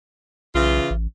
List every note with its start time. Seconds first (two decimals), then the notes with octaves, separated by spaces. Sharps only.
0.55 B1 C#3 E3 F4
0.91 A1